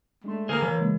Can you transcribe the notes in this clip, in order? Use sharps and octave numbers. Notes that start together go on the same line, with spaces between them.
G#3 A3 D4 C6
D3 A#3 G#4 A#4
E3 A#4 C#5
C#3 G#3 A#3